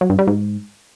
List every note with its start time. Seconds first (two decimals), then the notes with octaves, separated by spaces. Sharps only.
0.01 F#3
0.10 G2
0.19 G3
0.27 G#2